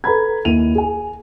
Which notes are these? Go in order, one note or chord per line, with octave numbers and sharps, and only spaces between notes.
A4 B4 A#5 B5 G#6
D#2 E4 D#7 F7
G#4 G#5